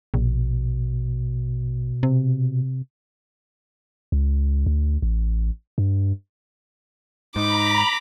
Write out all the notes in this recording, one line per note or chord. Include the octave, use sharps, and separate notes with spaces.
A#1 B2
C3
C#2
D2
A1
G2
G#2 D#4 A#5 B5 D6